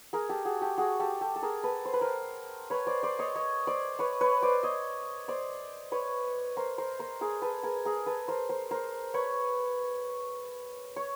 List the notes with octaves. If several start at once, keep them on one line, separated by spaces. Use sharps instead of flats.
G#4 A#4
G4 A4
F#4 G#4
G4 A4
F#4 G#4
G4 A4
G4 A4
A4
G#4 A#4
A4 B4
C5
B4
A#4 C5
B4 C#5
C5 D5
C5 D5
C#5 D#5
C#5 D#5
C5 D5
B4 C#5
B4 C#5
C5 D5
C#5 D#5
C5 D5
B4 C#5
A#4 C5
A#4 C5
A#4 C5
G#4 A#4
A4 B4
G#4 A#4
G#4 A#4
A4 B4
A#4 C5
A#4 C5
A#4 C5
B4 C#5
C#5